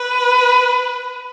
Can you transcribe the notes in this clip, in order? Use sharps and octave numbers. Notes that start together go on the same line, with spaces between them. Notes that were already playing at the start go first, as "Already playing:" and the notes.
Already playing: B4